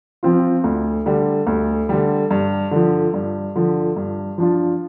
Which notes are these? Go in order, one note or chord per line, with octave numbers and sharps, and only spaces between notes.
F3 C4 F4
D2
D3 G3
D2
D3 G3
G2
D3 F3
G2
D3 F3
G2
F3 D4 F4